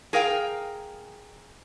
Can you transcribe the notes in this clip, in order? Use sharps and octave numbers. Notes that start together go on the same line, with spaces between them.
G#4 A#4 F5 G5